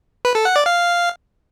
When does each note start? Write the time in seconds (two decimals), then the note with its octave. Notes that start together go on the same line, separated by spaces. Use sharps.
0.25 B4
0.35 A4
0.45 F#5
0.56 D5
0.66 F5